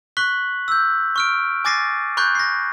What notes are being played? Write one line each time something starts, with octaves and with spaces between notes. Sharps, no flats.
C#6 F#6 B6 F#7
E6 G6
C#6 F6 D7
G#5 D6 A6 A#6 C7 D#7
B5 C#6 F#6 G6
A#6 C7